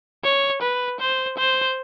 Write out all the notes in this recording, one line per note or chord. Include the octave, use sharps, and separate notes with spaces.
C#5
B4
C5
C5